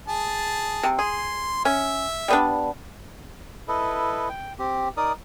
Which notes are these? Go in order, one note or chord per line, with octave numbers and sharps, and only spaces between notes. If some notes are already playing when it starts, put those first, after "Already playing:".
G#4 A5
C3
G#4 C6
C#4 E5
G3 B3 D4
E4 A4 B4 D#5
G5
C4 G4
D#4 A#4 D5 D#6